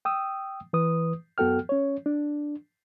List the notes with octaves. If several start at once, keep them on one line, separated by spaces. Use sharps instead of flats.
G5 D#6 E6
E3 B4 D#6
F#2 B3 F#4 A4 G5 F6
C#4 C#5
D4